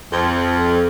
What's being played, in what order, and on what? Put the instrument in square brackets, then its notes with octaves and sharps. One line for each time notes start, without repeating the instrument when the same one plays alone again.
[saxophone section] F2